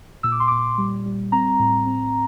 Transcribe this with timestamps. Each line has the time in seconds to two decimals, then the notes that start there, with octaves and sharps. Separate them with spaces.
0.23 A#2 E6
0.32 D6
0.40 C6
0.48 A#2 D6
0.78 G3
1.06 G3
1.32 C4 A#5
1.59 A2
1.86 C4